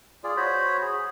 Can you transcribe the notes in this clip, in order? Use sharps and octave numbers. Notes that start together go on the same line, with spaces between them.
F4 G#4 D5
F#4 C5 C#5 B5
G#4